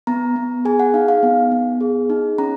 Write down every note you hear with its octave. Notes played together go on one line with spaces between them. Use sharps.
B3 A#5
B3
G#4 G#5
F#5
D#4 F5
F5
B3
B3
G#4
D#4
C#4 A#5